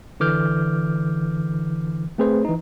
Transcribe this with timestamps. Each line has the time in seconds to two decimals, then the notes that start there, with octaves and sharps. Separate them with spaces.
0.20 D3 E3 D6 F6 G6
2.18 A3 C4 G#4 B4 C5
2.45 E3 D#4